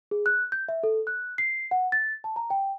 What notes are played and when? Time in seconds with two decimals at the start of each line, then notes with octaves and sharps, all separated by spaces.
0.11 G#4
0.26 F#6
0.52 G6
0.69 E5
0.83 A4
1.07 F#6
1.38 C7
1.71 F#5
1.92 A6
2.24 A5
2.36 A#5
2.50 G5